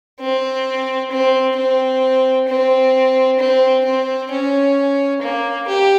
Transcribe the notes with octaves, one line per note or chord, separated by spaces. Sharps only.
C4
C4
C4
C4
C4
C4
C#4
A#3
G4